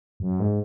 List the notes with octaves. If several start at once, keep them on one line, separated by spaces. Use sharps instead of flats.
F#2
G#2